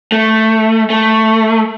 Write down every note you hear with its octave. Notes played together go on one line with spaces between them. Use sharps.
A3
A3